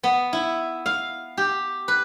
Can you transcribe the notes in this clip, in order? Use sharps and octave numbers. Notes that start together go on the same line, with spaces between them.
B3
E4
F5
G4
B4